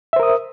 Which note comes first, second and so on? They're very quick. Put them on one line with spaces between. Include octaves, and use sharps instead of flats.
E5 C5 A#4 D#6